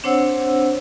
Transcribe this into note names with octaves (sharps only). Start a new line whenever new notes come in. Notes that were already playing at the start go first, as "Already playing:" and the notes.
C4 D4 C5 C#5 F#5 E6